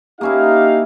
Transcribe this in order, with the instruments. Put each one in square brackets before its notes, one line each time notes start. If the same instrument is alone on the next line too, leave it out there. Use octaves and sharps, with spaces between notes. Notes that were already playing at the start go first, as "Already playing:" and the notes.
[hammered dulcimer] A#3 C#4 E4 [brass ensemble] D#4 G4 F5